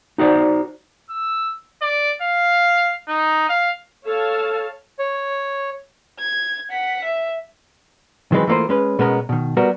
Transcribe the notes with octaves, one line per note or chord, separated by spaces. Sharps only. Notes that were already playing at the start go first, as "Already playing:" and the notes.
D#4 F#4 C5 D5
E6
D5
F5
D#4
F5
A4 C#5 F5 A5
C#5
G#6
F#5 B6
E5
D#3 E3 F#3 G#3 C4 B4
E3 A3 A#3 F4 C5
G#3 C#4 B4
B2 G#3 B3 C#4 A#4
B2 D#3
G3 B3 F#4 A#4